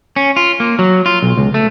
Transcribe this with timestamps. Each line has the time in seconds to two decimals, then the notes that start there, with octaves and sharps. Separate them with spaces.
0.16 C#4
0.36 F4
0.60 A#3
0.79 F#3
1.06 F4
1.23 B1
1.37 C#2
1.54 A3